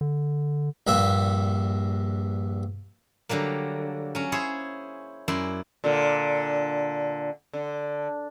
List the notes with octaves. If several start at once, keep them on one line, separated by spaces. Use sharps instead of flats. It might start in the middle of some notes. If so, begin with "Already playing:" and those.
D3
A#1 G2 A#3 E5
D3 F#3 G3 A#3
F#3 C#4
E4 G#4 C5 C#5
F#2 E4 D5 C6
A#2 D3
D3